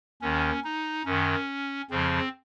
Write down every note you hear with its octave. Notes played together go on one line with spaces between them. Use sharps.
D#2 D#3 C#4
D#4
F#2 D#3 C#4
F2 C#3 F3 C4